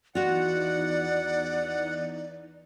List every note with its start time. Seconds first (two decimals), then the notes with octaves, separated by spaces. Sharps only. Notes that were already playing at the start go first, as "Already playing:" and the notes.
0.15 E2 E3 D#4 F4 F#4 D5 F#5